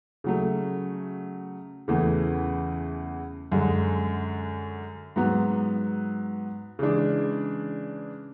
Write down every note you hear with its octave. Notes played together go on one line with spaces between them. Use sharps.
C#3 F#3 A3
E2 C#3 E3 A3
F#2 D3 G#3
G#2 F#3 B3
C#3 E3 G#3 D4